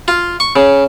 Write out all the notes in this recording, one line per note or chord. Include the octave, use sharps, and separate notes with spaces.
F4
C#6
C#3